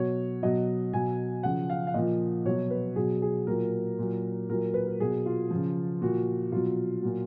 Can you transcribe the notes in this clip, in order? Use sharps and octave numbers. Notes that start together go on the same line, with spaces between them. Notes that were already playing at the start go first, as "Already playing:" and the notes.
Already playing: B2 F#3 C#5
B2 F#3 D#5
B2 F#3 G#5
C#3 F3 F#5
F5
F5
A#2 F3 D#5
B2 F#3 C#5
B4
B2 F#3 G#4
G#4
A#2 F#3 A#4
A#2 F#3
A#2 F#3 A#4
B4
A#4
B2 F#3 G#4
F4
C#3 F3
A#2 F3 F#4
B2 F#3 F4
A#2 F#3